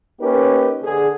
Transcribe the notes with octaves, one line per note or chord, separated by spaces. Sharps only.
A#3 C#4 D#4 G4 A#4 B4
D3 G#4